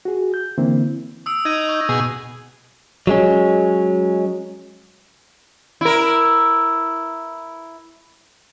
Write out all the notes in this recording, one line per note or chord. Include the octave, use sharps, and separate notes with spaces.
F#4 G#4
G6
D3 E3 A#3 C4 E4
D#6 E6 D7
D#4 G#6 D#7
C#6 G6
B2 G#4
F#3 G#3 C#4
E4 A#4